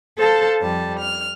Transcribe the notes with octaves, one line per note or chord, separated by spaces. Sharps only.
A4 C5 F5 A5
F2 G3 A5
F6